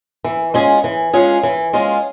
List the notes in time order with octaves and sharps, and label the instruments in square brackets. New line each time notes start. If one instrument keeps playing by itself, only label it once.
[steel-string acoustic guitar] E3
G#3 C#4 F4 G#4
E3
G#3 C#4 F4 G#4
E3
G#3 C#4 F4 G#4